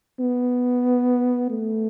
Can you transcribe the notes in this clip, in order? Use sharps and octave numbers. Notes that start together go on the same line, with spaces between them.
B3
A3